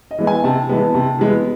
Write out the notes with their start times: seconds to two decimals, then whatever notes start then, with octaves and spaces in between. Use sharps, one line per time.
0.11 D#5
0.18 E3 G#3 B3
0.27 G#5
0.44 C3 A5
0.69 E3 G#3 B3
0.94 C3
1.19 E3 G#3 B3